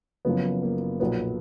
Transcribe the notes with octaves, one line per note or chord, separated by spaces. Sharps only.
F#1 F#2 F3 B3
A#3
B1 A#2 F3 B3